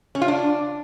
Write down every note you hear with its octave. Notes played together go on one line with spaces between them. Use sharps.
C#4
F4
D4